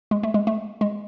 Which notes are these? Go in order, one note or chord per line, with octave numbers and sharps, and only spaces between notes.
G#3
A3
G#3
A3
G#3